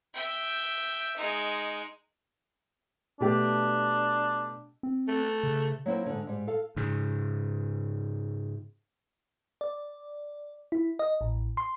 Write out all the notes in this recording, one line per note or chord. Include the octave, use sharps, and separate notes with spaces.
E5 G5
G#3 D#4
B2 A3 D4 G4
C4
A3
C#3
F#3 A#3 E4 C5 G5
G#2 D3
G#2 G3
A4 F5
G#2 C#3
D5
E4
D#5
A1
C6